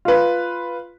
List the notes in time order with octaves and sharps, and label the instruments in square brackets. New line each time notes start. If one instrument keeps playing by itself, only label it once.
[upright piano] F4 B4